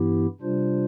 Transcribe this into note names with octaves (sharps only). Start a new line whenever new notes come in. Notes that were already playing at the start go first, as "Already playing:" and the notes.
Already playing: G2 E3 B3 E4 G4
C3 G3 D4 F4 C5